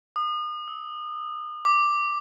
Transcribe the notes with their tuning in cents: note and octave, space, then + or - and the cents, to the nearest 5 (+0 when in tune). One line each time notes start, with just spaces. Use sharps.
D#6 -35
E6 -45
D6 +5